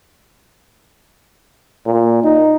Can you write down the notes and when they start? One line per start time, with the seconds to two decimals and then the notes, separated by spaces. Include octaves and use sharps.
1.86 A#2
2.23 D#4